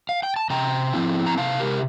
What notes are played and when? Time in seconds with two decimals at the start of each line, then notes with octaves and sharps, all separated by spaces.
0.09 F5
0.23 G5
0.36 A5
0.50 C3 G5 A#5
0.94 F3 C4 E4
1.26 A#5
1.38 C3 F5 A5
1.60 G4 A#4